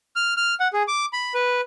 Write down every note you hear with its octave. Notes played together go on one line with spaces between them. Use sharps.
F6
F6
F#5
G#4
D6
B5
B4